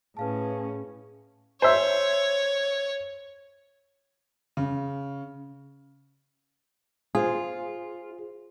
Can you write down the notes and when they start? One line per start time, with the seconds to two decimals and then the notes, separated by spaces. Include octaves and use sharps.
0.17 A2 C#4 G#4 B4 F5 A5
1.62 C5 C#5 E5
4.57 C#3
7.15 F4 G#4 C5